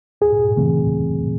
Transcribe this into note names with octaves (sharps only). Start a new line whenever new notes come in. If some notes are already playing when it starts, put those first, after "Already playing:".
D#2 G#4
C#3 E3 A3 C4
D#2